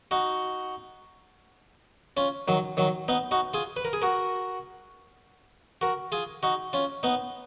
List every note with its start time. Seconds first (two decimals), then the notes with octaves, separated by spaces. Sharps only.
0.11 D#4 F#4
2.17 C#4 F4
2.48 D#3 F#3
2.77 D#3 F#3
3.08 B3 D#4
3.31 D#4 F#4
3.53 F4 G#4
3.76 B4
3.85 A#4
3.93 G#4
4.02 F#4 A#4
5.81 F#4 A#4
6.12 F4 G#4
6.43 D#4 F#4
6.73 C#4 F4
7.03 B3 D#4